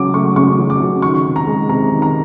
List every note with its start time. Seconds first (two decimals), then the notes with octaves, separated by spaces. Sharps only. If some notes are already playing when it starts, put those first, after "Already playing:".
Already playing: C#3 F#3 D6
0.14 A3 C#6
0.36 C#3 C#6
0.58 F#3
0.70 D6
0.80 C#3
1.02 D#3 C#6
1.25 C3
1.36 A#5
1.47 G#3
1.69 C3 A#5
1.92 D#3
2.02 A#5